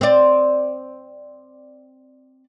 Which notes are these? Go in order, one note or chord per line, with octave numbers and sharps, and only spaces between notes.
C4 D5